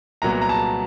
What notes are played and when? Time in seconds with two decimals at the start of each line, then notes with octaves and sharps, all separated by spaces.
0.22 C2 A#2 F#3 B3 A#5
0.41 A#5
0.49 A5